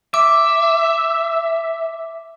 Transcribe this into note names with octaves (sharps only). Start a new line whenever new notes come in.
E5 D6